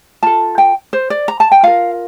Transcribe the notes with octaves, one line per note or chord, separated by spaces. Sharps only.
F4 A4 A5
G5
C5
D5
A#5
A5
G5
F4 A#4 F5